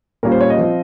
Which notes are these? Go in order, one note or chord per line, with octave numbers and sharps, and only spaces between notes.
A#2 G3 C#4 F4 A#4
C5
C#5
D#5
F3 C4 F4